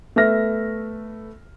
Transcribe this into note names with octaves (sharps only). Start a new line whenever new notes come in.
A3 B3 E5 F6 A#6